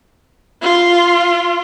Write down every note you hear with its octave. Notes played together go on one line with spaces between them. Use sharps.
F4